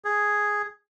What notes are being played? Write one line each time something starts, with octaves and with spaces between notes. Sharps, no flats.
G#4